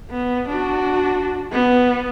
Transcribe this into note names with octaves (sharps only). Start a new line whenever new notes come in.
B3
D4 F#4
B3